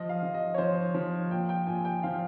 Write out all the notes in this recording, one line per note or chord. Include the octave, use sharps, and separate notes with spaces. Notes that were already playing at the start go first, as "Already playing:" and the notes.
Already playing: F3 D#5
F5
F3
D#5
C#5
F3 C5
F3
A#2 G5
G5
A#2 G#5
G5
F3 F5